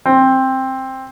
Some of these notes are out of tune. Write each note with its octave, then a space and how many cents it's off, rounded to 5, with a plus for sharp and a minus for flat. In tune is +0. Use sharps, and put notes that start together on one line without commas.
C4 +10